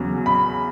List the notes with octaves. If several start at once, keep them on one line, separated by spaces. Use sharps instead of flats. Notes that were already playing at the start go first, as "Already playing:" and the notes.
Already playing: E2 C#3 F#3
B5